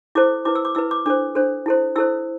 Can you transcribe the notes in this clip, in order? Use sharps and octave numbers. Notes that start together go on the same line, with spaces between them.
E4 A4 C5 D6
E4 B4 D6
E6
D6
E4 B4 E6
D6
D4 A4 C5 D6
D4 A4 C5
E4 A4 C5
E4 A4 C5 E6